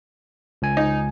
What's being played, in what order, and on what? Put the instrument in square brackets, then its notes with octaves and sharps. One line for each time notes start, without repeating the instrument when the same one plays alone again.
[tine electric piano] C#2 G#5
[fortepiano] D#4